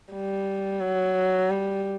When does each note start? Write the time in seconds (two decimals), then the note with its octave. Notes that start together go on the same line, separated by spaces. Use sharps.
0.13 G3
0.81 F#3
1.50 G3